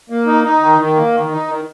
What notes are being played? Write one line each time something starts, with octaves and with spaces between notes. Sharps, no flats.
A#3
D#4
D#4
D#3
D#3
A#3
D#3
D#4
D#3